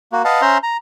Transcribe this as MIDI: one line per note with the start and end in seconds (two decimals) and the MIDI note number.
0.12 0.23 58
0.12 0.23 66
0.25 0.41 71
0.25 0.41 75
0.25 0.41 77
0.25 0.41 78
0.25 0.41 81
0.42 0.58 61
0.42 0.58 72
0.42 0.58 76
0.42 0.58 82
0.42 0.58 84
0.63 0.77 82